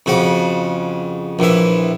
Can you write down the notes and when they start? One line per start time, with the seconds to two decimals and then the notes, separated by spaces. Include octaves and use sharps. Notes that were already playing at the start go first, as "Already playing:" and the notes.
0.06 F2 C#3 F#4
1.39 A#1 E3 E5